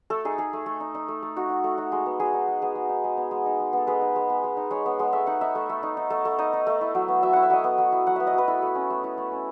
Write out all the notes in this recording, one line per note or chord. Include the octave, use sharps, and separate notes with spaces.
A3 A4
D#4 G#4
D#4 G#4
A3
A3
D#4
D#4
A3
A3
D#4 F#4
D#4
A3
D#4 F#4
G#3
B3
G#3 G#4
D#4
G#3
B3 G#4
G#3
D#4
G#3
B3
G#3
D#4
G#3
B3 A4
G#3 B4
D#4
G#3
B3
G#3
D#4
G#3 C#5
B3
G#3
A3 E5
D#4 F#5
D#4 E5
A3
A3
D#4
D#4
A3
A3
D#4 D#5
D#4
A3
E4
F#3
B3
F#3 E5
E4 F#5
E5
F#3 D#5
B3
F#3
E4
F#3 F#5
B3 E5
D#5
F#3 B4
E4 A4
A3
C#4
A3
E4
A3
C#4